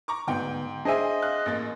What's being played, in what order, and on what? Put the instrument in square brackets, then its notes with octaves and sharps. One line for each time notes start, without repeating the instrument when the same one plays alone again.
[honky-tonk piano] A#5 C#6 D6
[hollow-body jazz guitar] D2 B3 [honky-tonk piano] G#2 G5 G6
[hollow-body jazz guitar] D4 G#5 [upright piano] G#4 C5 E5 [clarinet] D#5
[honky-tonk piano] F5 F#6
A1 A#3 A6